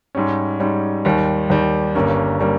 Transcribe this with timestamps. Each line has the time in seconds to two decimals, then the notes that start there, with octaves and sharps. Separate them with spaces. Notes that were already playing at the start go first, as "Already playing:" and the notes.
0.15 G#2 G3 C#4
0.60 G#2 G3 C#4
1.05 D#2 D#3 G3
1.50 D#2 D#3 G3
1.95 G1 G2 G3 A#3 C#4
2.40 G3 A#3 C#4